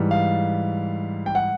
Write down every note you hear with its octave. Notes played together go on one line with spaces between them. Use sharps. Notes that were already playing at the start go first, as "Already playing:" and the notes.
Already playing: G#2 E3 G3
F5
G5
F#5